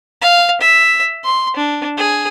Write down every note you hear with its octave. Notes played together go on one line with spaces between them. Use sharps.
F5
E5
C6
D4
G#4